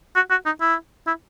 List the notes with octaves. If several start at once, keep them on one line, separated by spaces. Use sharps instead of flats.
F#4
F#4
D#4
E4
E4